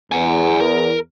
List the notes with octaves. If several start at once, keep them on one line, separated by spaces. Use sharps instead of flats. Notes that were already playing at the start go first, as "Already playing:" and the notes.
E2 F#5 G#5
A#4